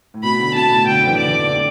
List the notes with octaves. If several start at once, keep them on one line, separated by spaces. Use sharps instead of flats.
A2
B2 B5
D3
B2 A5
A2
D3 G5
D3
E3
D5
E3
D3